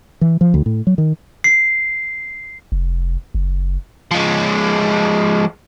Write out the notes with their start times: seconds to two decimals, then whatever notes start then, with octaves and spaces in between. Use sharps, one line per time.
0.21 E3
0.41 F3
0.54 D2
0.66 A2
0.87 F#3
0.98 D#3
1.44 C7
2.72 F1
3.35 F#1
4.11 F3 G#3